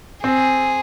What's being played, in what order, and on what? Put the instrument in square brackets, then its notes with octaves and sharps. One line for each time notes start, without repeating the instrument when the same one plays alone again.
[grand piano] C4 [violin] G#4